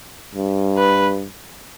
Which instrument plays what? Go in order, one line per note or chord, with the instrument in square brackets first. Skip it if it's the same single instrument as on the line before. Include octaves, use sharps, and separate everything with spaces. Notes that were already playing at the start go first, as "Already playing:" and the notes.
[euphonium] G2
[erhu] B4